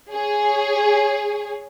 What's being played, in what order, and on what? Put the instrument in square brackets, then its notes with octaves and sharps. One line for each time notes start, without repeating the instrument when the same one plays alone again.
[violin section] G#4 C#5